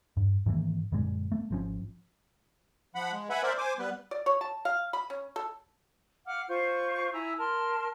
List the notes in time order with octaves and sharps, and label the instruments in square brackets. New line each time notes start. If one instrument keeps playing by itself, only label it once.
[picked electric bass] G2
G#2 D#3 E3 A#3
F#2 A#2 D3 G#3
A3 B3
G#1 F3 C#4
[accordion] F3 F#5 B5
G#3
B4 E5 F#5 G#5 B5
A#4 C5 D5 E5
C5 G#5 D6
G3 B3 B4
[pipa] D5
C#5
A5
F5
B5
C#4
A4
[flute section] F5 F#5 D6 F6
F4 C5 C#6 G6
E4 G#5 A#5
A#4 A5 C6 F6